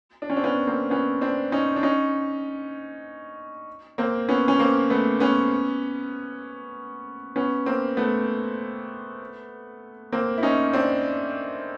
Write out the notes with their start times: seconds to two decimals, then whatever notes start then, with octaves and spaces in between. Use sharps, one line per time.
0.22 D4
0.30 C#4
0.36 C4 D4
0.44 B3 C#4
0.67 A#3 C4
0.90 B3 C#4
1.21 C4 D4
1.52 C#4 D#4
1.76 D4
1.83 C#4 D#4
3.98 A#3 C4
4.29 B3 C#4
4.48 C#4
4.59 A#3 C4
4.90 A3 B3
5.20 B3 C#4
7.36 B3 C#4
7.66 A#3 C4
7.97 A3 B3
10.12 A#3 C4
10.38 E4
10.43 C#4 D#4
10.73 C4 D4